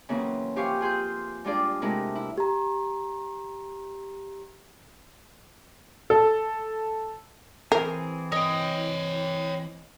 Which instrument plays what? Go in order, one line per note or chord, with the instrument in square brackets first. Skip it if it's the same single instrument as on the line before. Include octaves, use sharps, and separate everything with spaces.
[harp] C#3 E3 F#3 A#3 C4 C#4
F3 G4 C5 F5 G#5 C#6
F4 G#4 C6 G6
G3 G#3 D4 F4 G#4 D5
C3 G#3 A3 E4 A#4
E4
[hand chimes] G4 A#5
[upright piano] A4
[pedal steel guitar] E3 C4 G#4 [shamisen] A#4
[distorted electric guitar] C#5 G5 [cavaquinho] D#5